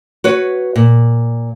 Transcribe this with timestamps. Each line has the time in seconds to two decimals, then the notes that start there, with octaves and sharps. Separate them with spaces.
0.24 F#4 B4 C#5
0.76 A#2